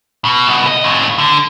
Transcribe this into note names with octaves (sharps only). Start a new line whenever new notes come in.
B2
C2 B2
D#5
D#2 A2
D3